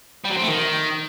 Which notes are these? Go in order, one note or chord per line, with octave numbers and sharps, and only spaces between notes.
G3
F#3
C4
A3
D#3